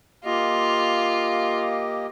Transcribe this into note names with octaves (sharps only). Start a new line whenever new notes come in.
A#3 F4 G4 D#5